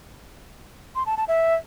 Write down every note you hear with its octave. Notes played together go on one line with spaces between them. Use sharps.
C6
A5
A5
E5